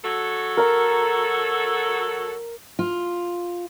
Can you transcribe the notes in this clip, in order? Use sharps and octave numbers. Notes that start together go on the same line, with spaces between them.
F#3 F#4 A4
A#4 A#5
F4